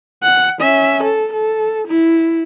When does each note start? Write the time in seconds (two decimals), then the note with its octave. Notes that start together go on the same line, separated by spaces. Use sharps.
0.23 F#5
0.61 C#4 E5
1.03 A4
1.33 A4
1.88 E4